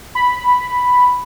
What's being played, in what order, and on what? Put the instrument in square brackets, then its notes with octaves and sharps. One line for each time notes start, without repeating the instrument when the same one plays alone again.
[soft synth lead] B5